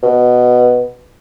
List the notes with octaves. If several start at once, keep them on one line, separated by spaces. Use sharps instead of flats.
B2